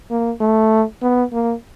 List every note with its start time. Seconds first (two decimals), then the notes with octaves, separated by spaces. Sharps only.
0.10 A#3
0.40 A3
1.02 B3
1.33 A#3